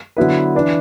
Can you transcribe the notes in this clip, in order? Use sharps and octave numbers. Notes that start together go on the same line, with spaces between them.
D3 F#3 B3 E4 B4
E3 D4 B4